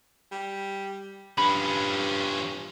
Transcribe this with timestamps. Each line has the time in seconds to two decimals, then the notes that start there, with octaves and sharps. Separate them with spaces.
0.32 G3
1.38 G2 F3 C#4 B5